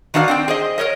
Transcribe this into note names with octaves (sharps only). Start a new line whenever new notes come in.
D#3 D4 F#4 D#5 F5
C4 D4 G5
G#4 C5 D#5
A#4 B4 C#5 D#5